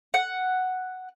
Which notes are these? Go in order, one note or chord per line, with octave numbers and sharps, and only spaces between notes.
F#5